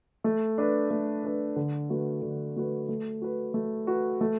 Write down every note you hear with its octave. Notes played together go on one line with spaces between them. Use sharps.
A3
D4 B4
A3
D4 B4
D3
A3 F#4 B4
D3
A3 F#4 B4
A3
F#4 B4
A3
F#4 B4
A3